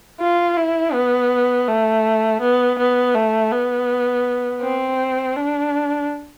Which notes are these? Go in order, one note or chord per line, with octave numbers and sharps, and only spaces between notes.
F4
E4
B3
A3
B3
B3
A3
B3
C4
D4